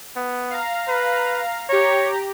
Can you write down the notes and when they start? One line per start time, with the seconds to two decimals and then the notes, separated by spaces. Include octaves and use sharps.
0.16 B3
0.51 F5 A#5
0.88 B4
1.69 G4 C#5 A#5